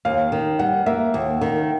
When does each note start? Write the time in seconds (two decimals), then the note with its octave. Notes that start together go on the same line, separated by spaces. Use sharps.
0.05 D#2 F5
0.32 D#3
0.59 G3 F#5
0.86 A#3 E5
1.14 D#2
1.41 D#3